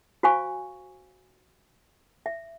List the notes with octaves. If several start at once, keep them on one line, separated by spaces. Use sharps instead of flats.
F#4 C5 F5 G#5 C#6
E5